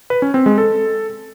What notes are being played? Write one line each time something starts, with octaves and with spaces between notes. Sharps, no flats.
B4
C#4
C4
G#3
A4